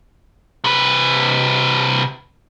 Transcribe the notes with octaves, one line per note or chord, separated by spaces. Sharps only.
C3 B4